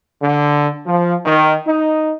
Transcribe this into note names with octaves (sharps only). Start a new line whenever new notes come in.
D3
F3
D#3
D#4